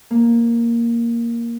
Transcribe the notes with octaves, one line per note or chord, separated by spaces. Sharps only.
A#3